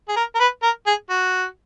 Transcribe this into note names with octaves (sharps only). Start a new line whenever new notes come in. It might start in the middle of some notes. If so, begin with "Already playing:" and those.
G#4
A#4
A#4
B4
A#4
G#4
F#4